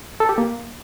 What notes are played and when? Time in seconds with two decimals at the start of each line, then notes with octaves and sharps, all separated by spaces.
0.20 A4
0.29 G4
0.38 A#3